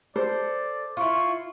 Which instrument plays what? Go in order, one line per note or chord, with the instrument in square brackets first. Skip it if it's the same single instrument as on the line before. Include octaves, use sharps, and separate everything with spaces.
[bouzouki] A4 [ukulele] C5 [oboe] D5
[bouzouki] E4 F4 [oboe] C#6